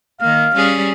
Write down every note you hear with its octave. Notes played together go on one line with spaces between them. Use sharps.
D#3 A#3 F5
G3 C#4 G#4